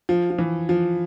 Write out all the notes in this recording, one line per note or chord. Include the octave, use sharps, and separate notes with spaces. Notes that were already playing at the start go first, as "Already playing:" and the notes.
F3
F3
E3
F3